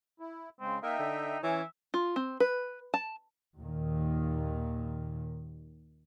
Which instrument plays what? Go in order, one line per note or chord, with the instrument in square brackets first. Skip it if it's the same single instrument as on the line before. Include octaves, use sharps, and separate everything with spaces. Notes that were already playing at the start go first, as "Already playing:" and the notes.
[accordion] E4
[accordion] C#3 G#3 [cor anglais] C4
[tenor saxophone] A#3 [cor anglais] D#4 [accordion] E5 G5
[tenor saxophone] D3
[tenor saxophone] E3 [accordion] C#4 C#5 [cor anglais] E5
[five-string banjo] F4
C4
B4
A5
[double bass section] D#2 A#2 D#3